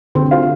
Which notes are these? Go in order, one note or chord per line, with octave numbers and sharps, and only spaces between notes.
D3 C4
F4 C5 F5